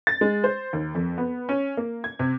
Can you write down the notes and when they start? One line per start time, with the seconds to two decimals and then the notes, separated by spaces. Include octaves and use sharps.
0.07 A6
0.21 G#3
0.44 C5
0.73 D#2
0.95 F2
1.18 B3
1.49 C#4
1.77 A#3
2.04 G#6
2.19 C3